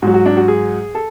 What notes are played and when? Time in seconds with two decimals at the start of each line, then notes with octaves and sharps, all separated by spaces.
0.02 G#2 F#3 F#4
0.14 F#4
0.26 D4
0.37 F#4
0.48 G#4
0.95 A4